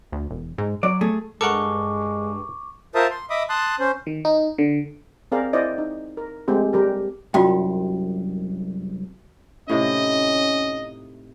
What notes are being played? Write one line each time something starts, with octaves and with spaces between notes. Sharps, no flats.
D2
E1
G#2
F#3 D5
A3 G#4
G2 G#3 A4 A#4 F#5 C#6 D6
F4 A#4 C5 E5 A5 D#6
C6
D#5 E5 B5 D6 D#6
A5 C6 D#6 F#6
C#4 C5
D#3
D#4
D3
C4 G#4 A#4 C5 D5 F5
E4 C5 D5 D#5
D#4
A#4
G#3 A3 C4 G4
G3 G4 A#4
C2 F#2 F4 F#4 G5
A2 C3 C#4 D#4 D#5